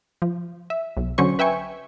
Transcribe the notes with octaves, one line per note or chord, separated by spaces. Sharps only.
F3
E5
B1
D3 F#3 C#4 C5 C#6
B4 E5 G5 G#5 C#6